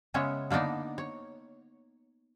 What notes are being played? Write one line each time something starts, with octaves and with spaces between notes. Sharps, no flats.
C#3 G#3 B3 C#4 C#5 E5
D3 A#3 B3 D4 D#4
C#5